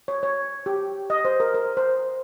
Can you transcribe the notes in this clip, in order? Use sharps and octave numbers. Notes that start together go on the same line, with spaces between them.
C#5
C#5
G4
D#5
C5
A#4
A#4
C5